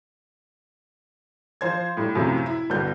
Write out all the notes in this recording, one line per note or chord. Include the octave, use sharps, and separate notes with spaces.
F3 C5 G#6
A2 G3
F#2 A2 C3 F3
E4
B1 G2 D3 B3 G6